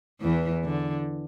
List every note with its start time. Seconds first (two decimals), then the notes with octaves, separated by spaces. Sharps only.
0.21 E2 E3
0.65 D3